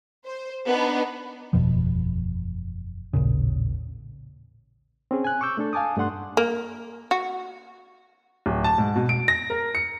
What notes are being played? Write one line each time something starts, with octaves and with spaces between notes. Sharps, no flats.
C5
B3 D4 D#4
F#1 E2 B2 F3
A1 D#2 A#2 C#3
C4 C#4 G#4
G#5 F#6
C#6 D6 E6 G6
A3 D4 A4
F5 G#5 A5 D6 D#6
G2 A3 D4 F#5 C6 F#6
A#3
F#4
D1
A5
G#2
B2
D7
A#6
A#4
C#7